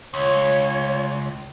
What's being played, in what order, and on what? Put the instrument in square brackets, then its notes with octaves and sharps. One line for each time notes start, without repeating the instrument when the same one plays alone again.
[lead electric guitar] C#2 [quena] C#5